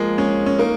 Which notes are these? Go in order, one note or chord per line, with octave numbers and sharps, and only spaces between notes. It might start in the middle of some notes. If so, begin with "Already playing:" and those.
Already playing: F3 G#3 A#3
G#3 C#4
C#4
A#3 D#4